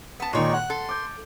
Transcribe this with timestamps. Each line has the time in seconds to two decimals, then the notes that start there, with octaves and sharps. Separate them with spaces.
0.20 B3 A5
0.33 A#2 D#3 G#3 D#4 C#5 D5 C#6
0.53 F#5 F#6
0.70 A4 C6
0.89 D6 G6